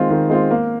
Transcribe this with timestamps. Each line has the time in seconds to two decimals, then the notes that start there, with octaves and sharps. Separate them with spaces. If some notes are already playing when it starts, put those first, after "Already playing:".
Already playing: D#3 G#3 C4 F4
0.10 D#3
0.30 G#3 C4 F4
0.51 A#3